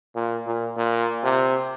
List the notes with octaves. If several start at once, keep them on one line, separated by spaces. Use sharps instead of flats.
A#2
A#2
A#2
C3